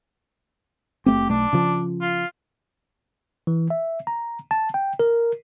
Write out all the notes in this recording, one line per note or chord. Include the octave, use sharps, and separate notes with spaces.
F#1 A3 C4 G4
B1 A3 D4
C#3 F3
F4
E3
E5
A#5
A5
G5
A#4